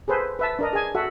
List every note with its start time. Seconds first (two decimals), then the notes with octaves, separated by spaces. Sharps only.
0.08 G#4 A4 B4 C5
0.39 B4 E5 A5
0.59 D4 A#4 D#5
0.73 G#4 G#5
0.95 F#4 A4 E5 F#5